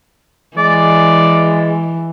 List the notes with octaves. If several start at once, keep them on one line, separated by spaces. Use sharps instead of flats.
E3 G#3 D5